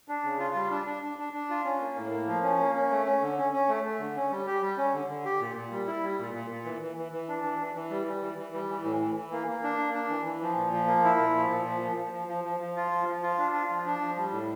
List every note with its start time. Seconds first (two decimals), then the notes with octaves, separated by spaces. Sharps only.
0.08 D4
0.24 C#3
0.40 F4
0.55 G3
0.71 D4
0.86 D4
1.03 D4
1.19 D4
1.33 D4
1.50 F4
1.64 C#4
1.81 A#3
1.97 A2
2.12 A#3
2.27 F3
2.43 C#4
2.59 A#3
2.75 C#4
2.91 A3
3.06 C#4
3.22 D3
3.38 C#4
3.53 C#4
3.68 A3
3.84 A3
3.99 D3
4.16 C#4
4.31 G3
4.47 G4
4.62 G3
4.78 C#4
4.93 D3
5.09 D3
5.25 G4
5.40 A#2
5.56 A#2
5.71 G3
5.87 E4
6.03 G3
6.19 A#2
6.34 A#2
6.51 A#2
6.65 E3
6.82 E3
6.97 E3
7.12 E3
7.29 D4
7.43 E3
7.60 E3
7.75 E3
7.90 G3
8.07 G3
8.22 E3
8.38 E3
8.54 G3
8.69 E3
8.84 A2
9.00 E3
9.15 E3
9.32 A#3
9.48 A#3
9.63 D4
9.78 A#3
9.94 D4
10.10 E3
10.25 E3
10.41 F3
10.56 A#2
10.73 F3
10.87 A#3
11.04 E4
11.19 A#2
11.35 F3
11.50 A#2
11.66 F3
11.82 F3
11.97 F3
12.13 F3
12.28 F3
12.44 F3
12.60 F3
12.76 F4
12.91 F3
13.07 F3
13.23 F4
13.39 D4
13.54 F4
13.70 F3
13.86 D4
14.00 F3
14.17 G3
14.32 A2